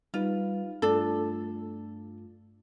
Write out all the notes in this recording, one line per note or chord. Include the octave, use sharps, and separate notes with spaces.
G3 D#4 F4 B4
G2 A3 D4 F4 A4